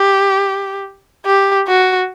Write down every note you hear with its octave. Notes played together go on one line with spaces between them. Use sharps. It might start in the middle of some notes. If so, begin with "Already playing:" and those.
Already playing: G4
G4
F#4